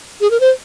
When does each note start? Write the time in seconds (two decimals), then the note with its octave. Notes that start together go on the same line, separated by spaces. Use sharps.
0.21 G#4
0.31 A#4
0.40 C5